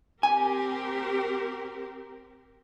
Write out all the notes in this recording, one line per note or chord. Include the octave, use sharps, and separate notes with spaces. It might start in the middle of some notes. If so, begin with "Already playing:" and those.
C4 G4 A#4 G#5